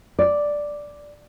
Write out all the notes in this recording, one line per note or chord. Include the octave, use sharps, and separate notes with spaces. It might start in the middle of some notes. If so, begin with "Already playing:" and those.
D5